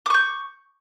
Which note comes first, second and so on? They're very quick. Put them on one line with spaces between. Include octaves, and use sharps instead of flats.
D6 C#6 G6